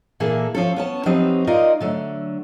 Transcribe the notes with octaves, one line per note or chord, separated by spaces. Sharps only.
A#2 E3 A#3 G#4 A4
F3 C#4 A4
B3 C#4 A5
F3 F#3 C4 D#4 G4 B4
G#3 D#4 F4 A#4 D5 D#5
D3 F#3 A3